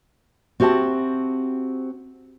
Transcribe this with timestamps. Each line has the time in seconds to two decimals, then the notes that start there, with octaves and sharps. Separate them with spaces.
0.60 C4 F#4 G4 E5 A5